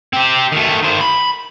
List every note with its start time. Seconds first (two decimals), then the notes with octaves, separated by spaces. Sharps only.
0.13 C4 G4
0.52 D#3 A3
0.83 D#3 C5
1.01 B5